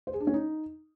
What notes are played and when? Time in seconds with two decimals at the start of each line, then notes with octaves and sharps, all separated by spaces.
0.07 C5
0.14 G#4
0.20 D4
0.27 C#4
0.34 D#4